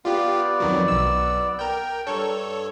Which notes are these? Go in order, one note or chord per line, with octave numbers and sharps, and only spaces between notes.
B3 F4 G4 D5
F2 D#3 F#3
B1 E6
A#4 G5
G2 A4 C#5